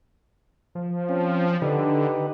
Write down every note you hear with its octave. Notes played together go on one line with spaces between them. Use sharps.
F3
C4 C#4
D3 D#4 G4 B4